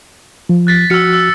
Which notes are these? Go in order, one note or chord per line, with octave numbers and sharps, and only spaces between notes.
F3
F#6 A6 B6
F3 F#4 E6 F6 C#7
E6